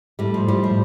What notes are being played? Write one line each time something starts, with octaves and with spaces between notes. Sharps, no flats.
A2 G3
F3
A2 G3
F3